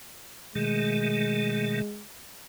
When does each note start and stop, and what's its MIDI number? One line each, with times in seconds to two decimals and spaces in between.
0.55 1.82 47
0.55 1.82 51
0.55 2.04 56
0.55 1.82 57